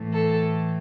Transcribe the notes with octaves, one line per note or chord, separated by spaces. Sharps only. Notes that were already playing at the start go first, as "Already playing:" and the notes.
Already playing: A2 E3 A3
A4